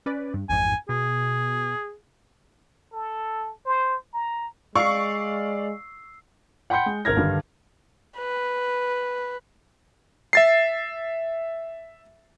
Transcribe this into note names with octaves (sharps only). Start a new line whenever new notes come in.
C#4 B4 D5
G2
A1 F2 G#2 G#5
B2 G#4
A4
C5
A#5
G#3 D5 F5 C#6 E6 C7
F#5 G5 B5 C6 G6 C#7
G#3
G#1 A#4 F6 G#6 A#6
G2 D3 D#3 G3
B4
E5 A6 C7